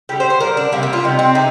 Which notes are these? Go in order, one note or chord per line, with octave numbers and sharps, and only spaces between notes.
D3 G3 G4
C5
C5
D3 G3 A#4
D4
C3 G3 A#3
A#3
F4
C3 G3 D#4
C4
C3 D#4